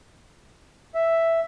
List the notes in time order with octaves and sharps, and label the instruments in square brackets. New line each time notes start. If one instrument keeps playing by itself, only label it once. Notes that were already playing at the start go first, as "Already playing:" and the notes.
[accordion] E5